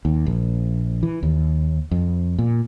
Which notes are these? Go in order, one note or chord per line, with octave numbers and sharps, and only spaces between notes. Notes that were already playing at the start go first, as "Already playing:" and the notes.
D#2
A#1
E3
D#2
F2
A#2